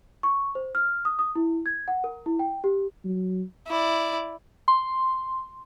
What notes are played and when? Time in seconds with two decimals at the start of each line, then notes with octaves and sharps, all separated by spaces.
0.23 C#6
0.55 C5
0.75 F6
1.05 D#6
1.19 D#6
1.35 E4
1.66 G#6
1.88 F#5
2.04 A#4
2.26 E4
2.39 G5
2.64 G4
3.05 F#3
3.67 E4 D5
4.68 C6